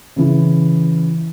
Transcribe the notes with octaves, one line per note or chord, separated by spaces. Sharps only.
C#3 E3